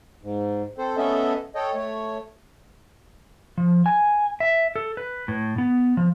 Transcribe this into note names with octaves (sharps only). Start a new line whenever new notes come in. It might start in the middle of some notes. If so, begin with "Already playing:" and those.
G#2
C4 A4 C5
A3 B3 C#4 A4 D#5 E5
A4 C#5 D#5 G5
A3 C#5
F3
G#5
E5
A4
B4
A2
B3
F3